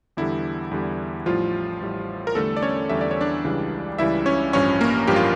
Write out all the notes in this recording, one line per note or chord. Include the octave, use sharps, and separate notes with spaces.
E2 D3 G3 E4
E2 D3 G3
A1 A2 F3 G3 F4
A1 A2 G3
A#4
E2 D3 G3 A3 A4
D5
C#4 C#5
E2 D3 G3 E5
D5
C#5
D4 D5
C#2 C#3 E3 G3
C#2 C#3 E3 G3 E4 E5
C#4 C#5
A1 G2 F3 C#4 C#5
A#3 A#4
A1 G2 F3 G4
F4